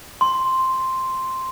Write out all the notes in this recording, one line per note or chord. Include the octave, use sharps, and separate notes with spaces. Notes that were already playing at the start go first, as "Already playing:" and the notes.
C6